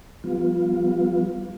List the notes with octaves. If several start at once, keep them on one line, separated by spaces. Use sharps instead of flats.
F3 G3 B3 F4